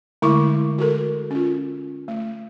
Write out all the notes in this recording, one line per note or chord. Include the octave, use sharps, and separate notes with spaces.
D3 G#3 A3 E4 C#6 D6
F#4 A4 A#4
C#4 F4
A3